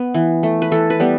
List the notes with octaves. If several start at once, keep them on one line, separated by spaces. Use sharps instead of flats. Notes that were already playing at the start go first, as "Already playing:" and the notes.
Already playing: B3
E3
A3
B4
E3 A4
B4
G3 B3